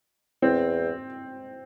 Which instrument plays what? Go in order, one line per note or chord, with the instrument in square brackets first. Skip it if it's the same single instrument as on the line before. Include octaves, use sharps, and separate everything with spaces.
[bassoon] E2 [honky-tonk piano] C4